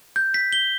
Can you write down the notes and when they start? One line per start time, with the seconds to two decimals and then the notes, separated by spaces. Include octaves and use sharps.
0.16 G6
0.34 B6
0.53 G7